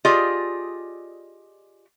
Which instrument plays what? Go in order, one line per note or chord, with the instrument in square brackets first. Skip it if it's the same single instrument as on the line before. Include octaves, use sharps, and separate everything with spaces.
[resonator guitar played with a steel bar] F4 G4 G#4 D5 D#5